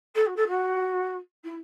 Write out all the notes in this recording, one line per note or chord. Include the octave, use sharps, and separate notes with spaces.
A4
F#4
A4
F#4
E4